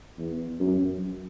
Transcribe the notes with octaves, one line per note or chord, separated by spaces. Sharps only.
E2
F#2